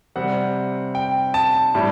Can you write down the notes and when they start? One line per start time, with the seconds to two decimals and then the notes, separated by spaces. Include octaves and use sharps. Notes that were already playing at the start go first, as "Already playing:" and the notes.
0.16 C3 G3 C4 F#5
0.95 G5
1.34 A5
1.75 A2 G3 D4